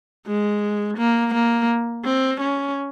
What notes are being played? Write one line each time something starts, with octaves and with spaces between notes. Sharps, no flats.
G#3
A#3
A#3
C4
C#4